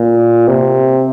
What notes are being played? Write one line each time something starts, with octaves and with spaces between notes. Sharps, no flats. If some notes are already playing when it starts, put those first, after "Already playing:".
Already playing: A#2
C3